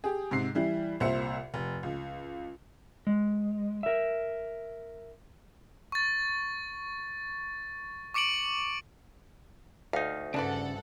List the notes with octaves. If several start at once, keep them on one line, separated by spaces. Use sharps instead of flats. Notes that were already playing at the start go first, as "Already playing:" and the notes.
G4 G#4
G#2 C3 C7
E3 G3 E4
C2 A#2 C5 E5 C#7
F1
C#2
G#3
A#4 E5
C#6 A6
C#6 D6 C#7 D7 F#7
D2 D#4 F5
G2 C#3 D4 A4 B4 D5 F#5